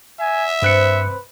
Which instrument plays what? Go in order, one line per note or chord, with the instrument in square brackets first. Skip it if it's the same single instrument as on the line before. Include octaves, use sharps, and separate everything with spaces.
[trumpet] E5 [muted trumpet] G#5
[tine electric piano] G2 F#6 C#7 [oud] C4 D5 [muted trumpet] B4